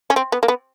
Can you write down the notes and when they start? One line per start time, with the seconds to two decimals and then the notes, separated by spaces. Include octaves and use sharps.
0.10 C#4
0.16 C4
0.32 B3
0.43 A#3
0.48 B3